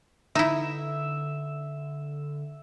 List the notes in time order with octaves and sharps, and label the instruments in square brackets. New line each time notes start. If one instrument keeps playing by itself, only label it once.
[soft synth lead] D3 [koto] D#4 E4 [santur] E5